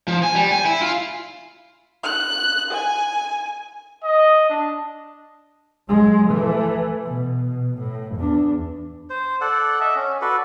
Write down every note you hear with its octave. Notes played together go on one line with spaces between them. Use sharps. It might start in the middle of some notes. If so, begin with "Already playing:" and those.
F3
G#5
G3
G#5
E4
F4
F#6
G#5
D#5
D4
F#3 G#3
E3 A3
B2
A2
E2 D4
C5
A4 D5 F#5
D#5 E5
C#4
F#4 A4 B4 D5